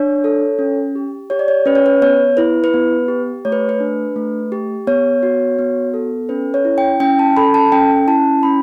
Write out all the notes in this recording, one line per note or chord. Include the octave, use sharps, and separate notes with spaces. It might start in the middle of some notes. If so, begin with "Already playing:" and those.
Already playing: D4 C#5
A4
C#4
G4
G4 C#5
D5
C#5
C#4 B4
C#5
B4
B3 C#5
E4 B4
B4
B3
G4
A3 C#5
B4
B4
D4
A3
G4
B3 C#5
F#4
B3
A4
C#4 B4
C#5
E4
G5
C#4 G5
A5
A4 B5
A5
C#4 G5
E4 A5
C#4 B5